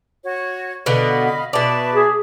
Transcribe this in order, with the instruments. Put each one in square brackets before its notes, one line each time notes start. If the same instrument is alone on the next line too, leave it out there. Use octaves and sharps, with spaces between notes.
[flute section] F#4 C#5
[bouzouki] B2 D3 B3 [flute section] D#5 F5 B5
[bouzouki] B2 D5 [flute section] B4 E5 A5
[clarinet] G#4